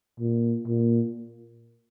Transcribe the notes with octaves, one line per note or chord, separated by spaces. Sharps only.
A#2
A#2